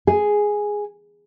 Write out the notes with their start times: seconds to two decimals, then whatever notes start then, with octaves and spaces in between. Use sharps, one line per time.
0.07 G#4